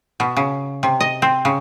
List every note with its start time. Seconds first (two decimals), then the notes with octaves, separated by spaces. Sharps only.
0.20 B2
0.37 C#3
0.83 C3
1.00 D#5
1.22 C4
1.45 C#3